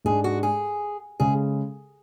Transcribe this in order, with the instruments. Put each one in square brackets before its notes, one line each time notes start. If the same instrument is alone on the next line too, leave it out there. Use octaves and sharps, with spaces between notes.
[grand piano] G#2 G#3 D4 [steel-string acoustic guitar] G#4
[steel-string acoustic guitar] F#4
G#4
[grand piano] C#3 G#3 [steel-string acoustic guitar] G#4